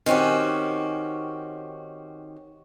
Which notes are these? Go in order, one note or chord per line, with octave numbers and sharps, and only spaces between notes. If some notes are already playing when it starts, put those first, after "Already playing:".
D#3 C4 C#4 F#4 G4